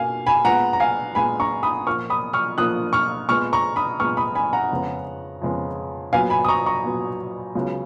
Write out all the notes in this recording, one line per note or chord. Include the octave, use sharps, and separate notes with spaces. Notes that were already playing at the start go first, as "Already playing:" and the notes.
Already playing: B2 A#3 F5 G#5
G#5 B5
A#2 G#3 B3 F#5 A#5
A#5
F5 G#5
A#2 G#3 B3 G#5 B5
A#5 C#6
B5 D#6
A#2 F3 A#3 C#6 F6
B5 D#6
C#6 F6
A#2 F3 A#3 D#6 F#6
C#6 F6
A#2 G#3 B3 C#6 F6
A#5 C#6
B5 D#6
A#2 G#3 B3 C#6 F6
B5 D#6
G#5 B5
F#5 A#5
F2 C#3 G#3 B3
F2 C#3 G#3 B3
A#2 F#3 B3 F5 G#5
G#5 B5
D#6
A#5 C#6
A#5 C#6
A#2 F#3 B3
C#2 C#3 F#3 B3